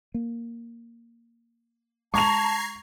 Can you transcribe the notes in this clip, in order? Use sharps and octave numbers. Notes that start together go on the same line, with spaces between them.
A#3
G#3 A5 A#5 C#6 G#6 C7 F7